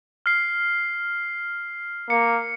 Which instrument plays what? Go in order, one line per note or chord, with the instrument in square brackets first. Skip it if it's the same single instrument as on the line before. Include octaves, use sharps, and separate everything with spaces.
[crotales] F6 C7
[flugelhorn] A#3 [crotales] C#7